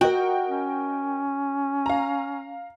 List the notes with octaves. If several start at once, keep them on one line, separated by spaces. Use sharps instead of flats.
F#4 A#4 D#5 G5
C#4
F5 A#5